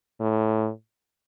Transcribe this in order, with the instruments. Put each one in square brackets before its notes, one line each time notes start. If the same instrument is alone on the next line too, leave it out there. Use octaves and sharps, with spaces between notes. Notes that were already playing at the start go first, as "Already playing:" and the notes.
[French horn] A2